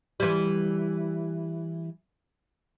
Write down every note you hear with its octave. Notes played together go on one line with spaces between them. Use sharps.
E3 G3